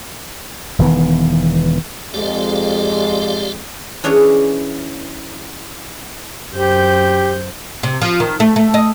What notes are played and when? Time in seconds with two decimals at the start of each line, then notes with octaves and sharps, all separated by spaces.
0.79 E1 D#3 E3 B3
2.14 F2 G#3 G4 D5 F5
4.04 E3 C#4 D4 G#4 C#5
6.53 F#2 G4 C5 G6
7.83 C3
8.02 F3
8.20 D#3
8.40 A3
8.56 A3
8.74 D#5